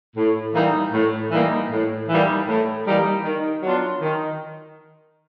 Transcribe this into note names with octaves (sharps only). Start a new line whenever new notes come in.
A2
E3 G3 A#3 D#4
A2
E3 G3 A#3 D#4
A2
E3 G3 A#3 D#4
A2
E3 G3 A#3 D#4
D#3
F#3 B3 D4 F4
D#3